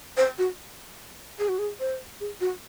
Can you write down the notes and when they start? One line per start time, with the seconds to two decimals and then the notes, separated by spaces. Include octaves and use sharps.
0.17 C5
0.38 F#4
1.39 G#4
1.49 F#4
1.59 G#4
1.80 C5
2.20 G#4
2.41 F#4